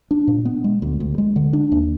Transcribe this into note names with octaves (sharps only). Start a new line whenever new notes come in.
D4
A#2
B3
G#3
D2
D2
G#3
D3
D4
D#2